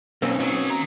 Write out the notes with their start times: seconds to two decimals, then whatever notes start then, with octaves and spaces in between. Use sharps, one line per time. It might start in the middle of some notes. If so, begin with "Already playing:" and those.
0.22 B1 A#3 C4 C#4
0.39 B1 F#3
0.70 D#3 A#5